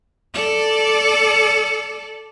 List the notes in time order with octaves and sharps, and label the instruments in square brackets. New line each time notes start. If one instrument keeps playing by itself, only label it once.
[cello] A4 D5